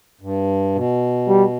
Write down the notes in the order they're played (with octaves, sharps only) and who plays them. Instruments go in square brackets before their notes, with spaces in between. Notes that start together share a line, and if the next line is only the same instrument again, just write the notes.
[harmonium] G2
B2
[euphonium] G3